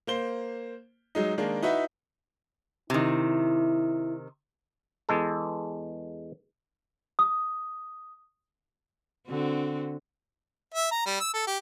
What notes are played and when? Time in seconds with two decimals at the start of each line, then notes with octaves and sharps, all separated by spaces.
0.07 A#3 C5 G7
1.15 F#3 G#3 D#4
1.38 D#3 G#3 A#3 D4 A#4
1.62 D#4 E4 F#4 B4 E5
2.90 C3 D#3 E4
5.09 E2 G#3 A4
7.19 D#6
9.28 D3 C4 F#4
10.74 E5
10.91 A#5
11.06 G3
11.20 E6
11.33 A4
11.47 G4